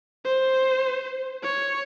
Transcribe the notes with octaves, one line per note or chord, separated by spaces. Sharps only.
C5
C#5